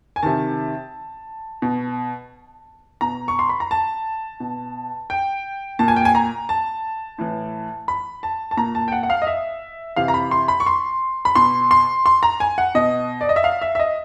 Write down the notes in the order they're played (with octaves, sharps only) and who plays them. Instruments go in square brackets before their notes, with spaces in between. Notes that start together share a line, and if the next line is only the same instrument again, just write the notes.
[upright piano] G#5
C3 D#3 A5
B2
B2 A#5
C#6
C6
B5
A#5
A5
B2
G5
A#2 A5
G#5
G5
G#5
A#5
A5
A2 E3
B5
A5
A5
A#2 A#5
A5
G5
F#5
F#5
F5
D#5
E5
C3 E3 F5
A#5
B5
C6
B5
C#6
C6
B5
B2 C6
C6
C6
A#5
G#5
F#5
B2 D#5
D5
D#5
E5
F5
E5
E5
D#5